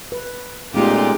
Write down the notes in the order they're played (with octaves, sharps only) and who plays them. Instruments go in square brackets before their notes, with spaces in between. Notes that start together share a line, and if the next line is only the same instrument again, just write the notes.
[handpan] B4
[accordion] A#2 [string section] G#3 [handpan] A3 B3 C#4 [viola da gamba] D#4 F4 G4